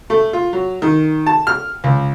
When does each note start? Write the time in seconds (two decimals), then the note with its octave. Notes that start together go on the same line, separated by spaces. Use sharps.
0.10 A3
0.33 F4
0.53 F#3
0.82 D#3
1.27 A5
1.47 F6
1.84 C#2